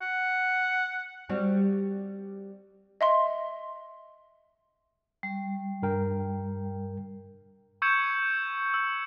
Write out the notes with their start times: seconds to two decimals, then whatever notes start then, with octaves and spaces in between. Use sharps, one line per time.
0.02 F#5
1.29 G3 C4 F#4
3.01 D#5 E5 C6
5.23 G3
5.83 G2 A#4 G5
7.82 C#6 E6 G6 G#6 C#7 E7
8.74 E6